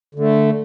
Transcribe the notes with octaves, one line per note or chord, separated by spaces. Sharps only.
D3 A3